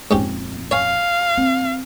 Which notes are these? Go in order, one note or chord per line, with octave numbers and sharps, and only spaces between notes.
D#1 F2 G#2 C#4 G4
C#5 F5 G#5
C4